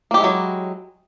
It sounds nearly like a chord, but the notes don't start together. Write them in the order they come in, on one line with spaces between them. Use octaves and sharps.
A#3 G4 G#3 E4 F#3